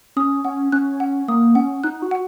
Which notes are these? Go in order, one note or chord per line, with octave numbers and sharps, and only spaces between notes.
C#4 D#6
C#4 F#5
C#4 F#6
F#5
A#3 D#6
C#4 F#5
D#4 F#6
F#4
F#5